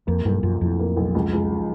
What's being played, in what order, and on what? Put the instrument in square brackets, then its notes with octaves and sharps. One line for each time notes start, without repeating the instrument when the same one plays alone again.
[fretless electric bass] F2 [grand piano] A#3
[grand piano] B1 [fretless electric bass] G2
[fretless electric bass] F#2 [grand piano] F3
[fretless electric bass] F2 [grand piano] A2
[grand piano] A#3
B1
C#2
C#2
F3